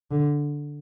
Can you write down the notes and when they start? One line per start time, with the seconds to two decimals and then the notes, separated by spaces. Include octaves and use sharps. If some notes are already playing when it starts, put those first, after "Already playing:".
0.11 D3